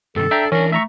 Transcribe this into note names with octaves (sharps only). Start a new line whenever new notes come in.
G2 C3 D#3 A4
D4 E5 G5 A#5
E3 C#4 D4 A#4
A3 E5 A#5 C#6